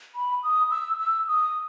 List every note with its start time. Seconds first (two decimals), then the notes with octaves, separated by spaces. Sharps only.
0.15 B5
0.43 D#6
0.71 E6
0.99 E6
1.28 D#6